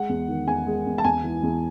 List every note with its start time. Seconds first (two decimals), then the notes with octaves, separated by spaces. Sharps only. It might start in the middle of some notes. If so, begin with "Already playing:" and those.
Already playing: G#3 F#5
0.09 E2
0.28 D#3
0.47 E2 G#5
0.67 G#3
0.86 E2
0.98 A5
1.04 E2 G#5
1.24 E3
1.43 E2